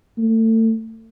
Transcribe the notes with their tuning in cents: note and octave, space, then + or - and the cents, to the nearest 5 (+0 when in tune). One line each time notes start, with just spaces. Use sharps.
A3 +30